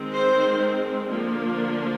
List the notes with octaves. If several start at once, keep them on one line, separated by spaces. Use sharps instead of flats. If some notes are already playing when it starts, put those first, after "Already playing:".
Already playing: D#3 G#3 C4
C5
D3 F3 A#3 D4